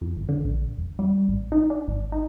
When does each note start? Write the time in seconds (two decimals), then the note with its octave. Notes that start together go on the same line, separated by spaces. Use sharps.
0.01 F2
0.16 G#1
0.29 D3
0.45 A#1
0.77 F1
0.99 G3
1.28 A1
1.52 D#4
1.70 D4
1.88 G#1
2.12 D#4